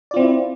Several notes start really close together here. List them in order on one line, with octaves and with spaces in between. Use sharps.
D5 F4 C4 E4